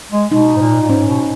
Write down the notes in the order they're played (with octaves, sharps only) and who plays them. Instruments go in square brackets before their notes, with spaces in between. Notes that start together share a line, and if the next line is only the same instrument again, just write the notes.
[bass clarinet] G#3
[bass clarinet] B2 [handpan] D#4
[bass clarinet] G#2
A#2
A#2
[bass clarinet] G#2 [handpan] C#4
[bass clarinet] B2